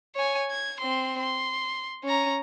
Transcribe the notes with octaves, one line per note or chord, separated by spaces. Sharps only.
C#5 G#5
G#6
C4 C6
C6
C#4 A#5